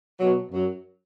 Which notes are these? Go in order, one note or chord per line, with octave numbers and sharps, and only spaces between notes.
B2 F#3
F#2 F#3